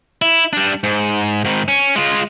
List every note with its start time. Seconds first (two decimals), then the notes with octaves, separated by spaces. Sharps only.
0.22 E4
0.53 G3 D4
0.83 G#2
1.45 G#2 D#3
1.68 C#4
1.96 G#3 F4